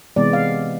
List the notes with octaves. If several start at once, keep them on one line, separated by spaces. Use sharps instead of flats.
C3 E3 G#3 B3 D5
F5